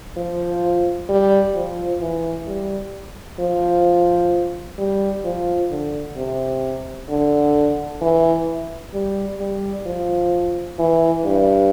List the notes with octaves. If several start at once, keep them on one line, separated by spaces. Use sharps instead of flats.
F3
G3
F3
E3
G3
F3
G3
F3
D3
C3
D3
E3
G3
G3
F3
E3
G2